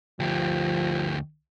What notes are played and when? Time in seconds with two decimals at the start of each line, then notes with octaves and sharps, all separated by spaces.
0.20 D2 F3 G4